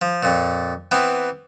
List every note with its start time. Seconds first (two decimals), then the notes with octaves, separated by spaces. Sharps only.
0.02 F3
0.23 F2 A#2
0.91 E3 B3 C4